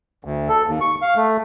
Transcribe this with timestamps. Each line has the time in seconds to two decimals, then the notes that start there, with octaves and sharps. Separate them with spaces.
0.25 D2
0.49 A4
0.67 D#2
0.81 C#6
1.02 F5
1.16 A3